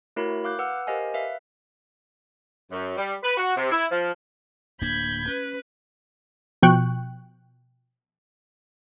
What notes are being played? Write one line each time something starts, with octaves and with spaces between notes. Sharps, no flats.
A3 E4 F#4 A#4 C#5 B5
F5 D6 F#6 G6
B4 F#5 E6 F6
G4 A#4 C5 D#5 F5 G#5
B4 E5 F5
F#2
G3
B4
F#4
C3
E4
F3
D1 A#3 D4 B5 G6 G#6
C#4 B4
B2 F3 G5 C#6 F#6